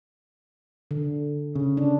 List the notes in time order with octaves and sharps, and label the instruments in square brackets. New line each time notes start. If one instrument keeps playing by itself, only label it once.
[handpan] D3
[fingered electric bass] C#3
[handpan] D4